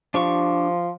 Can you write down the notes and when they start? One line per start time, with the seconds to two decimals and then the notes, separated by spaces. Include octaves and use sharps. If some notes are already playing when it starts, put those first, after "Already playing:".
0.14 F3 D4 G4 C#6